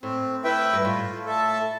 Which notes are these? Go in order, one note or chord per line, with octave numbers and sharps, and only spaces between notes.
A2 C4
E4 B4 E5 G5
G2
A2 F4
A4 E5 A5